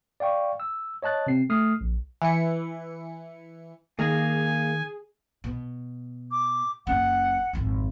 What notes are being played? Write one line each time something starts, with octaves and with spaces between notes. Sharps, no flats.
D5 F5 G5 C#6
E6
C#5 D#5 A5 F#6 A6
C3 C4 C7
A3 D#6 F6 C7
A#1
E3 C#7
D#3 A#3 G#4 F5 G#5 A#5
B2
D6
F#1 C#4 F#5
G#1 F2